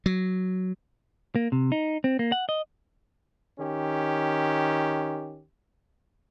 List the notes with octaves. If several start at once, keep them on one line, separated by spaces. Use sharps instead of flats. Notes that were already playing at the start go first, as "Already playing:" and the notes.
F#3
A#3
C3
D#4
C4
A#3
F#5
D#5
D#3 C#4 G4